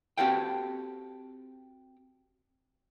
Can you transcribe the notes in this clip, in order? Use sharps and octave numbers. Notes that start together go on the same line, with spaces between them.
C4 F#4 G4 A4 F5 G5